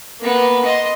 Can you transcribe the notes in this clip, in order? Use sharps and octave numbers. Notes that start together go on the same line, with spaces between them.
A#3 B3
D#5 C6